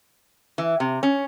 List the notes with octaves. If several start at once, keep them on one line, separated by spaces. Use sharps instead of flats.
E3
C3
C#4